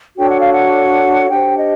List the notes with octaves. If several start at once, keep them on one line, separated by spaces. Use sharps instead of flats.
D4 F#4 A4 C#5 G5
F#5
F5
F#5
D4 G4 C5 G5
D#5